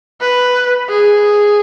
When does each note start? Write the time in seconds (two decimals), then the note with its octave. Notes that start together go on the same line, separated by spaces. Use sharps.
0.21 B4
0.89 G#4